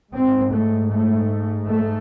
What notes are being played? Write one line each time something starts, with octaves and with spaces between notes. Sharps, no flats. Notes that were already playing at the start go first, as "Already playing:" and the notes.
G#2 C4
A3
A3
A3